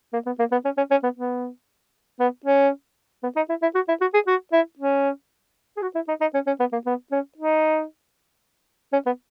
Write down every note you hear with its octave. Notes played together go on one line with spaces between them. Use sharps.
A#3
B3
A#3
B3
C#4
C#4
C#4
B3
B3
B3
C#4
B3
D#4
E4
E4
F#4
E4
F#4
G#4
F#4
E4
C#4
G#4
F#4
E4
D#4
D#4
C#4
C#4
B3
A#3
B3
C#4
D#4
C#4
B3